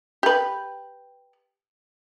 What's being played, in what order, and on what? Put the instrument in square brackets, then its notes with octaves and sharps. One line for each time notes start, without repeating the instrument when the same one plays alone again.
[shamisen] G4 B4